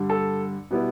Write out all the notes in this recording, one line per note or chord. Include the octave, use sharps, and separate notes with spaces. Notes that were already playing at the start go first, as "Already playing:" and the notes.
Already playing: G2 D3 G3
A4
B2 G3 B3 E4